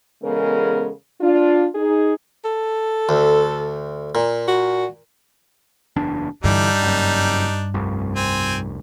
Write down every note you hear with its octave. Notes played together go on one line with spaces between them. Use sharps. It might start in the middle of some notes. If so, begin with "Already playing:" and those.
E2 C#3 G#3 B3 A4 A#4
D4 F4
D#4 G#4
A4
D2
A#2
F#4
F#1 E2 D4
G2 D3 E3 G3 D4 D#4
F#1 F#2
F1 C2
C4 G5 G#5